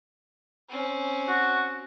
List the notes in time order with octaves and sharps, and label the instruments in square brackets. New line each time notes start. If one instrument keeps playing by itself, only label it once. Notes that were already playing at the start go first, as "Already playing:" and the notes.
[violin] C4 C#4
[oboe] F#4